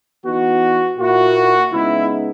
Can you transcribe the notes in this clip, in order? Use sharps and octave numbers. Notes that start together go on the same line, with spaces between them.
E3 B3 D#4 F#4
A#2 A#3 E4 F#4
C#3 G#3 B3 D#4 E4